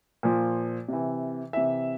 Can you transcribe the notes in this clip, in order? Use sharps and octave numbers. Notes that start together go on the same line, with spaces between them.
A#2 F3
C3 E3
C3 E3 E5